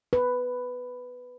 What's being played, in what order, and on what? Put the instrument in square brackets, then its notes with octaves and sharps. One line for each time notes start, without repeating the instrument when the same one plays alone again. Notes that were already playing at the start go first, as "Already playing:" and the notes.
[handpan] B4